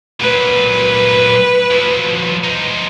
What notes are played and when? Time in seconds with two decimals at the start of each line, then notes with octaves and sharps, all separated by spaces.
0.20 A#2 F#3 B4
1.70 F3 F#3
2.44 F3 D#4